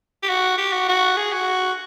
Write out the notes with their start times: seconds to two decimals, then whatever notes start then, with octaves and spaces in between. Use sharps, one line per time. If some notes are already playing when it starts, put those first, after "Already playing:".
0.23 G4
0.30 F#4
0.58 G4
0.73 F#4
0.88 F#4
1.17 G#4
1.33 F#4